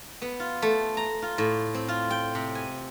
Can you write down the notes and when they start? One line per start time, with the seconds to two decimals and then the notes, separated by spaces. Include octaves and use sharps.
0.22 B3
0.40 F4
0.62 A3
0.97 A#5
1.22 F4
1.38 A2
1.75 C4
1.88 F4
2.10 G5
2.35 C3
2.55 G#5